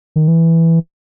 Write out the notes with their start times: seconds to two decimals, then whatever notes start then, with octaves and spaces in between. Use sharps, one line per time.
0.16 D#3
0.28 E3